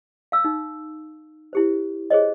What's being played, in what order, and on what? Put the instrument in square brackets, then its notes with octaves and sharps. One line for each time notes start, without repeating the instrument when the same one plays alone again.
[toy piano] F5 E6
D#4
E4 G4 C5
G#4 C5 C#5 D#5